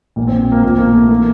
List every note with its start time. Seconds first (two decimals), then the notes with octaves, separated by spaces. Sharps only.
0.16 A#1 A#2 F3 A#3
0.27 C4
0.52 A#3
0.63 A#1 A#2 F3 A#3
0.78 A#3
0.94 A3
1.09 E3 A#3